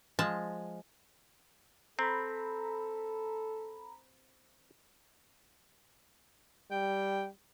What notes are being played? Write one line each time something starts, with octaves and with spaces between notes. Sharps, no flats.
F3 G#3 A5
C4 A4 A#5 B5
G3 G5